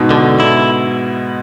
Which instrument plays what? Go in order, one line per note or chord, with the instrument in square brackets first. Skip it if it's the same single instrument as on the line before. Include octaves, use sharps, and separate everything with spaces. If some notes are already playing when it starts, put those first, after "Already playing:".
Already playing: [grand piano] G#2 B2
[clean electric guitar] D3
E4